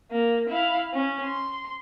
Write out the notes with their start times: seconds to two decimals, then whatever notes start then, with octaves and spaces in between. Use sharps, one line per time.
0.11 A#3
0.49 E4 F5
0.93 C#4
1.24 C6